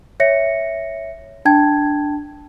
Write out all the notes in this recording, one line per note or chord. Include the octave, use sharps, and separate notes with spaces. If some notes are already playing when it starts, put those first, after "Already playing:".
C#5 E5 A#6 C#7
D4 G5 A5 G#6